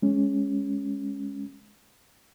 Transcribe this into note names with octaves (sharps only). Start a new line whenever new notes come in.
G#3 C#4